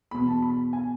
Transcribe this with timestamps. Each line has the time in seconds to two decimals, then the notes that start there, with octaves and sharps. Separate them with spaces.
0.11 E2 B2 B5
0.27 A5
0.42 B5
0.73 G#5